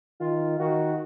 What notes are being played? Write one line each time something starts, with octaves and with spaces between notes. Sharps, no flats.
D#3 F4
D#3 F#4